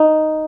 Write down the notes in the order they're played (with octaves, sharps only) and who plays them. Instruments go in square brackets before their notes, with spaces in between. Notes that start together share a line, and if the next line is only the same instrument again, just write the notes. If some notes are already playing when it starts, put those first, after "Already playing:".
Already playing: [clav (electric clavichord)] D#4